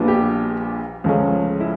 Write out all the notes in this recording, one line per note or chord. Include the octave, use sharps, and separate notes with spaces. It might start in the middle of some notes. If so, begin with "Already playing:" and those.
Already playing: A#1 A#2 G3 B3 D4
G4
C#2 C#3 F3 A3 C#4
E4